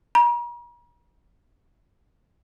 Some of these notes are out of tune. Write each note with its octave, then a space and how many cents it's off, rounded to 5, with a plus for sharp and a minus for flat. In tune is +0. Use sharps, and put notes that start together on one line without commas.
A#5 +45